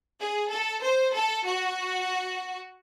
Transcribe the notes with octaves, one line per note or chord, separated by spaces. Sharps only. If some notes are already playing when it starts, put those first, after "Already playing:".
G#4
A4
C5
A4
F#4